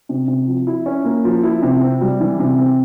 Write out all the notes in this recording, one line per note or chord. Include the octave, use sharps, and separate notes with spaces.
C3
C3
F3
E4
C#4
A#3
F3
E4
C3
C4
G3
E3
C3
C4